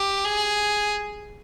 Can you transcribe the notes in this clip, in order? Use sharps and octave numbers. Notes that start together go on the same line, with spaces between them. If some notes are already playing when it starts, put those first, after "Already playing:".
Already playing: G4
G#4